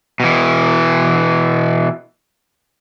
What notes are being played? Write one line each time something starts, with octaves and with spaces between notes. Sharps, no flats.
B2 E3